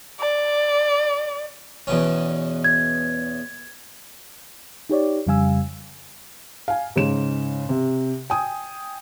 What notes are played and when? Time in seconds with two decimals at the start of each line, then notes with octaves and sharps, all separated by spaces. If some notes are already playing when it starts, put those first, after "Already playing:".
0.20 D5
1.87 E2 B2 C#4
2.64 G#6
4.90 D#4 G4 C#5 D5
5.27 F2 C#3 G3 F5 G#5 E6
6.68 F5 G#5
6.96 G#2 C#3 E7
7.69 C3
8.30 G5 G#5 D#6